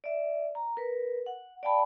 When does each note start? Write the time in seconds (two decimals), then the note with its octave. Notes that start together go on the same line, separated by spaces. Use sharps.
0.04 D5 E5
0.55 A#5
0.77 A#4 B4
1.26 F#5
1.63 D5 F5 G5 A5 B5